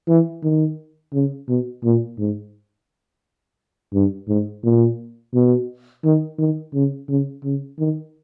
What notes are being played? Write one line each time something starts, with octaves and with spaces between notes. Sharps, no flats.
E3
D#3
C#3
B2
A#2
G#2
G2
G#2
A#2
B2
D#3
D#3
C#3
C#3
C#3
D#3